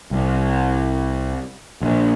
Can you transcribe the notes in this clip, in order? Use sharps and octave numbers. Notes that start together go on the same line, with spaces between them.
C2
A#1